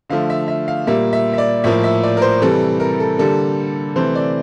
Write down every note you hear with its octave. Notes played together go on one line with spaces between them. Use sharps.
D3 F3 A3 F5
E5
E5
F5
A#2 G3 A#3 E5
E5
E5
D5
A2 F3 A#3 E5
E5
D5
A#4
C5
C3 E3 G3 A4
A#4
A4
D3 G3 A#3 A4
C3 E3 A3 C5
D5